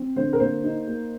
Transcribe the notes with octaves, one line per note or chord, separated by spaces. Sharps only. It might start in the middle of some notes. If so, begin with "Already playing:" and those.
Already playing: C4
D3 C5
A#4
A#3 C5
D#4
A#3